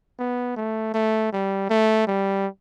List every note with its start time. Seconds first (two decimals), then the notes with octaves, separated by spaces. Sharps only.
0.19 B3
0.57 A3
0.94 A3
1.33 G3
1.70 A3
2.07 G3